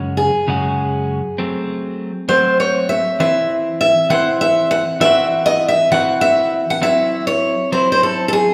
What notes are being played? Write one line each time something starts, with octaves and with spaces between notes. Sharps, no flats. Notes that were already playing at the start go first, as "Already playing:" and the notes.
Already playing: F#2 C#3 G#3 C#4 F#4
G#4
F#2 C#3 G#3 C#4 F#4
F#3 A3 C4
F#3 A3 C4 C5
C#5
E5
E3 C4 E4 C5 E5
E5
E3 C4 E4 C5 F#5
E5
F#5
E3 C4 F#4 E5
D#5
E5
E3 C4 F#4 F#5
E5
F#5
F#3 C4 E4 E5
C#5
F#3 C4 E4 C5
C5
A4
A4
G#4